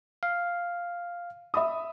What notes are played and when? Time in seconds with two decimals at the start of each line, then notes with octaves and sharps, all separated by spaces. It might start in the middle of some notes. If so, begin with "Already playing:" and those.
0.23 F5
1.54 E5 B5 D#6